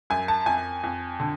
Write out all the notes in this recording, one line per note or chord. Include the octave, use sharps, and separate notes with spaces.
F#2 G#5
A5
F2 G#5
F2
D3